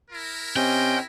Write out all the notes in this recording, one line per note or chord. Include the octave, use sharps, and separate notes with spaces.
E4 A#4
C3 C#4 C5 D#5 G5